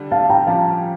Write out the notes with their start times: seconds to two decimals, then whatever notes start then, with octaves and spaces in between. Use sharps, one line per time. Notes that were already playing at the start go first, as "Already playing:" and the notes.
Already playing: D3 G3 D4
0.11 F5 A5
0.30 G5 A#5
0.47 F3 C#4 G4 F5 A5